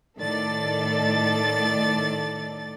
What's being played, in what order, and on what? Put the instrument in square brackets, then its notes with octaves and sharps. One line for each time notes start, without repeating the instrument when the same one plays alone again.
[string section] A2 D#3 A4 D5 A6